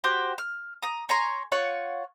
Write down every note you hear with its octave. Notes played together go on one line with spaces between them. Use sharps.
F#4 G4 C5 G5
F6
A#5 D#6
C#5 G#5 A#5 C6
F4 C#5 F#5 C#6